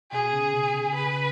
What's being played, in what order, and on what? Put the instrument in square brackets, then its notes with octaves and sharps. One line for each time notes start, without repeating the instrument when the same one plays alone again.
[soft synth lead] B2 [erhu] G#4
[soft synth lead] C#3
B2
C#3
[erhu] B4